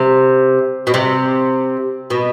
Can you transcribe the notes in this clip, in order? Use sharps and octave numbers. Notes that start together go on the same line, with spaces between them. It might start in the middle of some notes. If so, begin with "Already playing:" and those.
Already playing: C3
B2
C3
B2